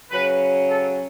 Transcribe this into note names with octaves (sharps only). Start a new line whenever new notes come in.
C#3 F#3 C#4 B4
A4